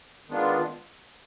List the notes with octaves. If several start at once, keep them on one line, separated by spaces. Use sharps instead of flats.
D#3 G#3 B3 D4 F4